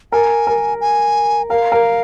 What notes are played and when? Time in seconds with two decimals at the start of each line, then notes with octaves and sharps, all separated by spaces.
0.12 A#4 G#5
0.47 A#4
0.81 G#5
1.50 A#4 F5
1.72 A#4